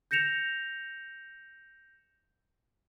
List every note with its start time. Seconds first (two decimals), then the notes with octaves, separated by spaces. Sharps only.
0.11 G6 A#6 C#7 E7 F7